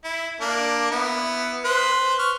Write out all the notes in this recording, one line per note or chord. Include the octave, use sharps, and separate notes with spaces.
E4
A#3 D4
B3 E4
B4 C5
C#6 F6